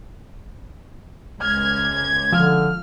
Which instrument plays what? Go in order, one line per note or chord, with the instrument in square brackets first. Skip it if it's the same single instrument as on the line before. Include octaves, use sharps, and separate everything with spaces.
[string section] C#2 G#6 [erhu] F6
[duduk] D3 [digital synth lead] F3 [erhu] F6